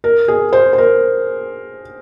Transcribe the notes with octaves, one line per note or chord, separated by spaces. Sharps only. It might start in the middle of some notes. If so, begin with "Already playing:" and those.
A#4
G#4
C5
C5
A#4